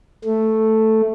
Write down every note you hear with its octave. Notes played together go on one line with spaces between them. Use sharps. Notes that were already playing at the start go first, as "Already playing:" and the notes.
A3